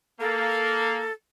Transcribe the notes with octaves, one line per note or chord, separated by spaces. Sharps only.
A#3 A4